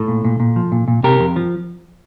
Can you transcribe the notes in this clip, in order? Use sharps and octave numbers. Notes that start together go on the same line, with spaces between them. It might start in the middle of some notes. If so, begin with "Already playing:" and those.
Already playing: A2 A4
A#2
A#2
A#2
F3
A#2
A#2
C3 G4 A#4
F2
F3